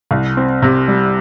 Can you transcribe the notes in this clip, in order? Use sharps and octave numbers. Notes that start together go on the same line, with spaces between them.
C2
C4
C3
G3